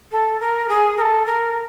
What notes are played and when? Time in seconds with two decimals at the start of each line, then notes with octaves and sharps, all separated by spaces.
0.11 A4
0.40 A#4
0.68 G#4
0.97 A#4
1.01 A4
1.26 A#4